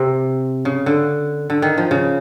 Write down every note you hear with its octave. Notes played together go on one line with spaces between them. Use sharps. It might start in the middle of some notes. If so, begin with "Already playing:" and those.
Already playing: C3
C#3
D3
D3
D#3
F3
C#3